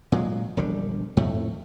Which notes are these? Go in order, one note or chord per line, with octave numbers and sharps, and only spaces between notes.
A#2 F#3 G#3
E1 A#1 D3 G3
F2 A2 A3